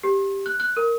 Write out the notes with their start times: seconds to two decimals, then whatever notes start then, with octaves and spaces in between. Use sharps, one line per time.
0.03 G4
0.46 F#6
0.60 F#6
0.77 A#4